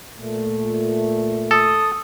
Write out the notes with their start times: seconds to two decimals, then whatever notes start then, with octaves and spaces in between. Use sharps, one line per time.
0.19 A#2 A3
1.51 A4 D#6